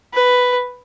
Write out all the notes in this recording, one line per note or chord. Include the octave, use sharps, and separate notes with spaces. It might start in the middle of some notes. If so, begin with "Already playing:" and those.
B4